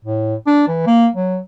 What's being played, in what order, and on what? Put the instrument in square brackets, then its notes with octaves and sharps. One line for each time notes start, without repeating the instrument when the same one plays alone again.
[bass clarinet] A2
D4
E3
A#3
F#3